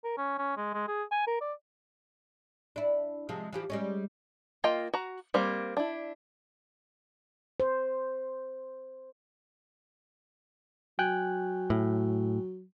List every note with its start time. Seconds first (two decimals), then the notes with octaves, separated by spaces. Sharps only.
0.04 A#4
0.17 C#4
0.38 C#4
0.57 G#3
0.74 G#3
0.88 G#4
1.11 G#5
1.27 A#4
1.41 D5
2.76 D4 E4
3.29 C3 F3 G#3
3.53 E3 F3 G4
3.70 G3 G#3 C#4
4.64 A#3 F4 D#5 G5
4.94 F#4 A#5
5.34 G3 A#3 C4
5.77 D4 E4
7.60 C5
10.99 F#3 G5 G#5 F#6
11.70 A2